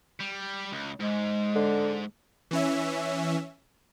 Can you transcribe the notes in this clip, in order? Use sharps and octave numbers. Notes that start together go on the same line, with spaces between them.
G3
C#2
G#2 G#3
D3
E3 C#4 E5